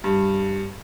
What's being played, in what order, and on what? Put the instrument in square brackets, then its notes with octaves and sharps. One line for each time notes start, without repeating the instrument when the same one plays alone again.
[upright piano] G2